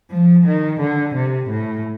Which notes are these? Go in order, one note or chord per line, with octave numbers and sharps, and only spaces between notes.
F3
D#3
D3
C3
A2